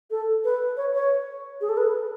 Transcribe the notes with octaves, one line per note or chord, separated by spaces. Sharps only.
A4
B4
C#5
C#5
G#4
A4
B4